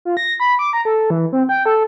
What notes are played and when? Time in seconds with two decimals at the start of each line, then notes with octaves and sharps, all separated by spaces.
0.05 F4
0.17 A#6
0.40 B5
0.59 D6
0.73 A#5
0.85 A4
1.10 E3
1.33 C4
1.49 G5
1.66 A4